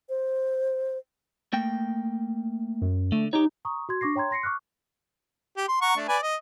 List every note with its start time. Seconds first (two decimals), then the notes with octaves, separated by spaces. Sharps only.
0.09 C5
1.53 A3 A#3 G5
2.81 F#2
3.12 D3 A3
3.33 D#4 G4 C#5
3.65 A#5 C#6 D#6
3.89 F#4 C6 G#6
4.01 D4 C#6 D6 A#6 C7
4.16 C#5 G5 A#5 C6 G#6
4.31 C6 A#6 C7 C#7
4.43 C#6 D6 F6 F#6
5.57 G4
5.69 C6
5.82 F#5 A#5 C#6
5.97 A3 D4
6.09 B4 D5 G#5
6.22 D#5